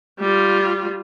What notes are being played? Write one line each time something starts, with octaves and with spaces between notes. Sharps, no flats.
G3 F4